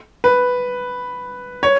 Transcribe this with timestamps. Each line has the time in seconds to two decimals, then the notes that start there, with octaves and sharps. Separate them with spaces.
0.24 B4
1.63 C#5